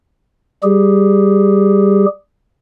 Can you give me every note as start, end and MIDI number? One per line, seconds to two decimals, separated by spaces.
0.63 2.06 55
0.63 2.06 67
0.63 2.06 68